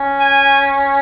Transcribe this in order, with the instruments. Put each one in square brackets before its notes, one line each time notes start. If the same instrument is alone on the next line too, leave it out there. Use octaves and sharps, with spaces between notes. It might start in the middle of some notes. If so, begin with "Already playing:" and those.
Already playing: [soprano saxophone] C#4
[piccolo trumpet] G#5